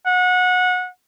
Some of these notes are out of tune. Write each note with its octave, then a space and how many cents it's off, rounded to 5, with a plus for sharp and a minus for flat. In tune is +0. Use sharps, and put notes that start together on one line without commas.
F#5 -25